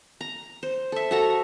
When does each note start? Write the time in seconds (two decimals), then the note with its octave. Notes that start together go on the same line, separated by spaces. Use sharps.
0.21 A#5
0.63 C5
0.92 A4 E5
1.11 F#4 A4 A#5